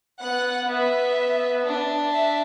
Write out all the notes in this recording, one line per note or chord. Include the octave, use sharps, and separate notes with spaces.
B3 F#5
B3 E5
D4
E5